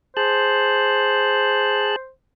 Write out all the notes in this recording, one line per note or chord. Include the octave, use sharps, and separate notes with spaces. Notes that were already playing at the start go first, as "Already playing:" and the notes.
G#4 C5 A5 F#6